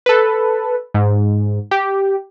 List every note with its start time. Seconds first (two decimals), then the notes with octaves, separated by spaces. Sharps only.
0.06 A4 B4
0.94 G#2
1.71 G4